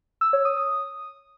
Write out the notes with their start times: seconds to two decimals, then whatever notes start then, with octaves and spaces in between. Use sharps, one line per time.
0.21 E6
0.33 C#5
0.45 D#6
0.57 D#6